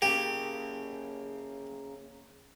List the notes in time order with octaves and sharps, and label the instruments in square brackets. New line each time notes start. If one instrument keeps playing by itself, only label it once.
[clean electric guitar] C#3 A#3 [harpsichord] G4